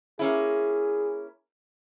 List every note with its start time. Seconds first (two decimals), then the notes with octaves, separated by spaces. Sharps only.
0.19 A#3 C#4 E4 G#4